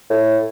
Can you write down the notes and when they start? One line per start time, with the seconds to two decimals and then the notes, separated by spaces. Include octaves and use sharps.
0.10 A2